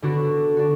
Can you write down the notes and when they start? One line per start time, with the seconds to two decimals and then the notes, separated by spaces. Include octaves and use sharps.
0.02 D3 B3 D4 F#4
0.57 D4 F#4